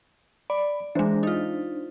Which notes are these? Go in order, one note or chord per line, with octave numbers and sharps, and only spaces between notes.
D5 B5
E3 G#3 D4 C5
D#4 F4